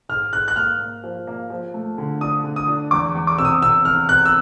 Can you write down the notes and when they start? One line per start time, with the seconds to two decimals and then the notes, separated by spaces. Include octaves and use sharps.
0.09 G#2 F6
0.32 G#2 F#6
0.48 F#6
0.56 A#3 F6
0.79 A#3
1.04 F3
1.27 A#3
1.50 F3
1.74 A3
1.98 D3
2.21 D4 D#6
2.44 D3
2.56 D#6
2.67 D4
2.91 E2 D6
3.15 E2
3.27 D6
3.38 C3 E6
3.45 D#6
3.62 C3 E6
3.85 E3 F6
4.09 C3 F#6
4.26 E6